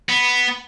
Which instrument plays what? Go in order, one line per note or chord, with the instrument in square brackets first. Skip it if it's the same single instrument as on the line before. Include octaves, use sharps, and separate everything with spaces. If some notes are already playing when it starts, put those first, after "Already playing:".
[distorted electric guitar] B3